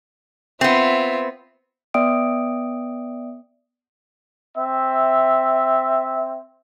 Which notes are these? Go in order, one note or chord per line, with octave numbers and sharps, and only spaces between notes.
B3 C4 F4 E5
B3 D5 E5 G5 D#6 D7
C4 E5